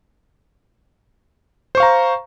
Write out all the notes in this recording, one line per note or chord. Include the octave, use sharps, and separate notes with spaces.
C5 F5 A#5 C#6